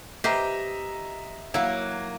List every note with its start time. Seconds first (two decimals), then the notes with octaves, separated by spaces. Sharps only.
0.24 G4 B4 C5 D#5 E5 A#5
1.54 F#3 A#3 E4